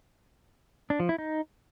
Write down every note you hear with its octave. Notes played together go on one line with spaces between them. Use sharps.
D4
F3
E4
D#4